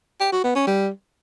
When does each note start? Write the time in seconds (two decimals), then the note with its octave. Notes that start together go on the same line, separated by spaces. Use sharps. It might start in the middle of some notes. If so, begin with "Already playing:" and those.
0.21 G4
0.32 F#4
0.44 B3
0.55 C#4
0.67 G3